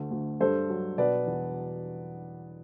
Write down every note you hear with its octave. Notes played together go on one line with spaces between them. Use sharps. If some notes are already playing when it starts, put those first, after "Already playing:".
Already playing: D2 A3
D2
G2 A4 C5
F#3
B2 B4 D5
E2